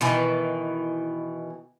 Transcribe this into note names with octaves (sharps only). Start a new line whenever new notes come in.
B2 D#3 E3